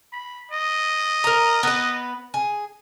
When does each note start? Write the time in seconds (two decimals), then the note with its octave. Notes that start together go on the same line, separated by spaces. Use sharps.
0.12 B5
0.51 D#5
1.24 A#4 A#5
1.63 B3 B4
2.34 G#4